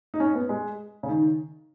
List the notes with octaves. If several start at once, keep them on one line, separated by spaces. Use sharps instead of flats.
D#4
C#4
B3
G#3
C#3
D#3